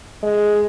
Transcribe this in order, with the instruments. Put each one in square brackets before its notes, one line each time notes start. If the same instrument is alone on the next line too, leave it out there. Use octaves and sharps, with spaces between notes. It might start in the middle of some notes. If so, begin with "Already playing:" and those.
[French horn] G#3